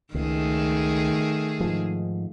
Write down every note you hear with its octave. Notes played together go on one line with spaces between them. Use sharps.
C#2 D#3 A3 G#4
G#2 F3